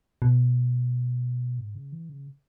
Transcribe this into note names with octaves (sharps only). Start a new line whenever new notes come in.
B2
G#2
C#3
E3
C#3